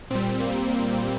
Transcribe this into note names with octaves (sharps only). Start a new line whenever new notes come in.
A#2 G3 C4
A#3
A#3